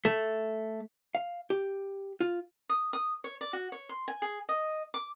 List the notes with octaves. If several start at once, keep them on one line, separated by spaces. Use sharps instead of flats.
A3
F5
G4
F4
D#6
D#6
C#5
D5
F#4
C#5
C6
G#5
G#4
D#5
D6